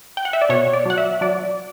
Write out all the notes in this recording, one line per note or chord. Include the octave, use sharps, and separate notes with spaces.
G5
F#5
E5
D5
B2 C#5
D5
F#3 F#5
E5
F#3 D5